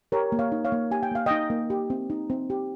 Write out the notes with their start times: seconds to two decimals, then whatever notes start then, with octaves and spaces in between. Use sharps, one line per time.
0.12 G4 A#4 C#5
0.32 A#3
0.39 C#5 F5
0.52 D#4
0.65 C#5 F5
0.72 A#3
0.91 G4 G#5
1.03 G5
1.11 A#3 F5
1.26 D#4 D#5 G5
1.50 A#3
1.70 G4
1.90 C4
2.10 D#4
2.30 C4
2.50 G4